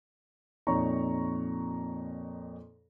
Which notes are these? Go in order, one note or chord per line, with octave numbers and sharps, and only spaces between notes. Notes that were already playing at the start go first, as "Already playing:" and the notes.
F2 A#2 D#4 C#5 A#5 C#6